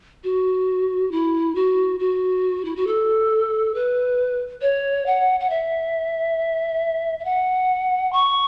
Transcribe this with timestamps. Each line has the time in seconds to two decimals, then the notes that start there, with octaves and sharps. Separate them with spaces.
0.24 F#4
1.12 E4
1.55 F#4
2.00 F#4
2.65 E4
2.76 F#4
2.87 A4
3.74 B4
4.62 C#5
5.06 F#5
5.40 F#5
5.50 E5
7.19 E5
7.25 F#5
8.13 C#6